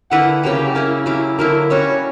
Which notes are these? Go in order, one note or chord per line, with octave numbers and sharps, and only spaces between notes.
D3 A#3 E4 B4 F#5
C#3 F#3 A#3 G4
A#3 C#4 E4
F#3 A#3 E4 G4
D3 F#3 A#3 E4 A#4
G3 C#4 F#4 C#5